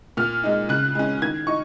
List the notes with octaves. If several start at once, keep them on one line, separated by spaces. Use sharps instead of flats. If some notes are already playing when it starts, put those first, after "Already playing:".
A#2 F6
G#3 D#4
C#3 F#6
G#3 C#4
D#3 G#6
D#4 C#6